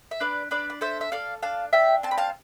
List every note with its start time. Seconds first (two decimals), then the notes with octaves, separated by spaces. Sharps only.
0.11 E5
0.20 D4 B4 D5
0.51 D4 B4 D5
0.70 D5
0.81 A4 C5 E5
1.01 E5
1.12 A4 D5 F5
1.42 D4 F5 A5
1.73 D4 E5 G5
2.03 C4 A5
2.11 B5
2.18 F5 A5